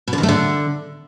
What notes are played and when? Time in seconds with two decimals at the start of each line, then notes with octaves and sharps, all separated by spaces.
0.08 B2
0.13 D3
0.18 D#3
0.23 A3
0.29 D3